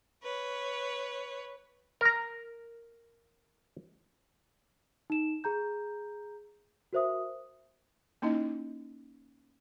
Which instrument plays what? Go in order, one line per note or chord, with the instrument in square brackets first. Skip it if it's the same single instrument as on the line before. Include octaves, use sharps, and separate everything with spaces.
[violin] B4 C#5
[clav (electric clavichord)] A#4 A#5
[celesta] D#4 E7
G#4 A#5 G6
F#4 A#4 C5 E5 D#6
[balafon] A#3 C#4 D#4 E4 D#5